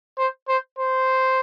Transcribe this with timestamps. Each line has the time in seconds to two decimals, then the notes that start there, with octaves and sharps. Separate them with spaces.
0.18 C5
0.48 C5
0.79 C5